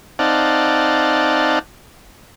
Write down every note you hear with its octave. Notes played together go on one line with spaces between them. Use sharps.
C4 D#4 D5 F5 F#5 A5